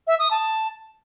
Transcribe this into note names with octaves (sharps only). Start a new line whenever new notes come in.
E5
D#6
A5